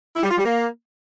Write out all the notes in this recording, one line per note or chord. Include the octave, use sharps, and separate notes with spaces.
E4
G3
F4
G3
A#3